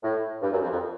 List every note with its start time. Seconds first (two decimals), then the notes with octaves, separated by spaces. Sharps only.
0.03 A2
0.42 G2
0.52 F#2
0.61 F2
0.72 F2